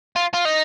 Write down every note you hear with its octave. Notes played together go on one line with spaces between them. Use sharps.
F4
F4
D#4